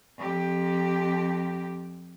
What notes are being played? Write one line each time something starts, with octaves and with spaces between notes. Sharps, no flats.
F2 G4